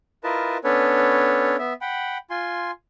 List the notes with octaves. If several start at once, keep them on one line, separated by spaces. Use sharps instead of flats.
E4 F4 A#4 B4 D#5 A5
B3 C#4 D4 A4 B4 C#5
B3 E5
F#5 G5 B5
F4 G#5 C6